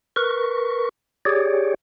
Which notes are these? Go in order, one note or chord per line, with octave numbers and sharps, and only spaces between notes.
A#4 B4 C#6
G4 G#4 C#5 D5